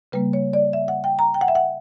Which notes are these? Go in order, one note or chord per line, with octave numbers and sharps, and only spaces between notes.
C#3 G3 A#3 B4
C#5
D5
E5
F#5
G5
A#5
G5
F#5
E5
F#5